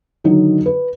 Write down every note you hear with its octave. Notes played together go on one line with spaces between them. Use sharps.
D3 D#3 F#3 D#4
B4